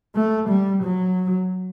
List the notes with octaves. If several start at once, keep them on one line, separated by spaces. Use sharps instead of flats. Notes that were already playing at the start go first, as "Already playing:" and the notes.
A3
G3
F#3